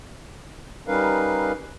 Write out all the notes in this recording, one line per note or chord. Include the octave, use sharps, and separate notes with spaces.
G3 C#4 D#4 A#4 B4 F5